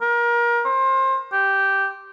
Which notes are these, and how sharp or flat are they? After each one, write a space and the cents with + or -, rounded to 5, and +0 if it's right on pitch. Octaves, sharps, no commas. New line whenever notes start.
A#4 +30
C5 +25
G4 -5